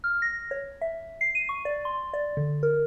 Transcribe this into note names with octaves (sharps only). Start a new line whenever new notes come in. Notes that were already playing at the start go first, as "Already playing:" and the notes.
F6
A#6
C#5
E5
C7
D#7
C#6
D5
C6
D5
D3
A#4